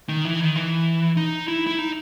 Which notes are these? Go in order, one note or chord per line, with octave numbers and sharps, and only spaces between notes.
D#3
E3
D#3
E3
D#4
E4
E4
D#4